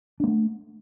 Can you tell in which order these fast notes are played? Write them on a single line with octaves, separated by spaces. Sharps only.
D4 A#3 A3